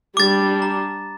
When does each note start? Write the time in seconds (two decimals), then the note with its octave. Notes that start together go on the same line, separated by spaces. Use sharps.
0.17 G3 D4 D6 A6
0.62 A#5